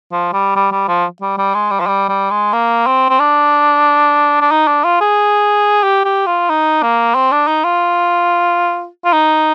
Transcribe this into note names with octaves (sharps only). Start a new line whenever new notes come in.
F3
G3
G3
G3
F3
G3
G3
G#3
G3
F3
G3
G3
G#3
A#3
C4
C4
D4
D4
D#4
D4
F4
G#4
G4
G4
F4
D#4
A#3
C4
D4
D#4
F4
F4
D#4